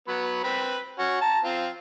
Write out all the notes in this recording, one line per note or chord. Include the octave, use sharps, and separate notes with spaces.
F#3 B3 B5
C4 B4 B5
C#4 F#4
A5 A#5
C4 F4